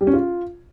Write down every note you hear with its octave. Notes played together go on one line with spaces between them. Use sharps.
G3
C#4
F4